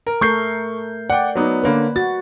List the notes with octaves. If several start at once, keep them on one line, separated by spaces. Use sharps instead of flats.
A#4
A3 A4 A#4 C#6 G6 C7
D5 F#5 G5
F#3 B3 D#4
D3 A#3 C#4 B4
F#4 A6